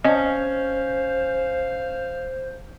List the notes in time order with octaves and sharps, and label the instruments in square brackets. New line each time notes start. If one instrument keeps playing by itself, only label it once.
[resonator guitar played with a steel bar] C#4 [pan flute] C5 [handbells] D#5 [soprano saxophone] F5